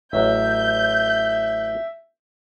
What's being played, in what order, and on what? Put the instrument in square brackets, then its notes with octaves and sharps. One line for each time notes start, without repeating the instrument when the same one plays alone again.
[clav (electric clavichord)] A1 F#3 [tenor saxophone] E5 [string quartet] G6